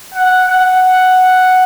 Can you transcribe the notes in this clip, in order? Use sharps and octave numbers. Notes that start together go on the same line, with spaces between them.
F#5
F#5